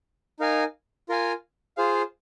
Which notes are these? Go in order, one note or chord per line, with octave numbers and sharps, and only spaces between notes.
D#4 A#4 F5 G#5
F4 A#4 F5 G#5
F4 G#4 C5 F5